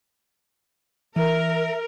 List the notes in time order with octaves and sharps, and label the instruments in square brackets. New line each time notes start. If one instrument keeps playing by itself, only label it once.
[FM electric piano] E3 [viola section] A#4 [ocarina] E5